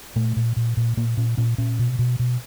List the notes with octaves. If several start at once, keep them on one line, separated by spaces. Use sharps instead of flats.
A#2 A3
A#2
A#2
A#2
A#2 A#3
A#2 C#4
A#2 C#4
A#2 C#4
B2
B2
B2